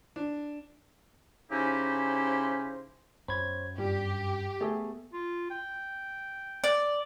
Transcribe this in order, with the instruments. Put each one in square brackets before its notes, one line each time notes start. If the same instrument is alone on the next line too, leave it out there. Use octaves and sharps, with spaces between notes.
[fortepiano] D4
[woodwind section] C#3 C#4 D#4 E4 G4 C5
[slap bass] F#2 [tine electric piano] C5 C#5 G#6 [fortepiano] B5
[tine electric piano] G2 [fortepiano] G3 [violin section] G4
[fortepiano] A3 G#4 [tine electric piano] B3
[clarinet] F4
G5
[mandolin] D5